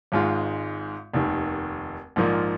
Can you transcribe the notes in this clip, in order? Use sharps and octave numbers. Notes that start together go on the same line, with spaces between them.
G#1 G#2 G#3 F4
F1 D#2 D#3
A#1 G#2 F3 A#3